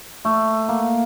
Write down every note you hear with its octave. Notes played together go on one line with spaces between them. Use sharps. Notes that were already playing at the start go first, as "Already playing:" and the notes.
A3
A#3